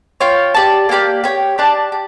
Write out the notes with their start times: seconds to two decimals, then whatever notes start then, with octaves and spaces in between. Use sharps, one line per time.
0.21 F4 C#5 G5
0.55 G4 D5 A5
0.89 A#3 D4 G4 D5
1.24 G4 C#5 G5
1.58 D4 G4 D5 A5
1.92 G4